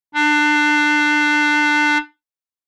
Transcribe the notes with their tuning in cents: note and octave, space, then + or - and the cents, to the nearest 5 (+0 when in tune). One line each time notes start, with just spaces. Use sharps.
D4 +25